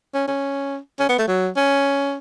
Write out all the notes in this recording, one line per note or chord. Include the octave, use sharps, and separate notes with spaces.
C#4
C#4
C#4
B3
A3
F#3
C#4